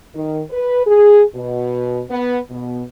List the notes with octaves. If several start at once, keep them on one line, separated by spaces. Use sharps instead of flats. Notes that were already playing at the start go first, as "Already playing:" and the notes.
D#3
B4
G#4
B2
B3
B2